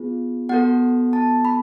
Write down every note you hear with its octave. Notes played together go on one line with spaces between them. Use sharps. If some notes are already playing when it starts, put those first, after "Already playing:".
Already playing: B3 F4 G#4
B3 F#4 A4 F#5
A5
B5